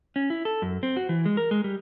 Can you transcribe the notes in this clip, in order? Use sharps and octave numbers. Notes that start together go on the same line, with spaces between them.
C#4
E4
A4
F#2
C4
F#4
E3
G#3
A#4
G#3
G3